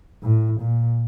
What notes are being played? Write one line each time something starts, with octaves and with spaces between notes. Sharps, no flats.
A2
A#2